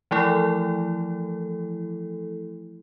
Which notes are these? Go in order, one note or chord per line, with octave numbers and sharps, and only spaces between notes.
E3 F3 A3 E4 A4